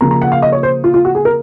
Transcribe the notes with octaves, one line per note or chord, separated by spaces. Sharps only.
C#3 F3 A#3 A#5
A#5
F#5
F5
D#5
C#5
C5
F4
F4
F#4
G#4
A#4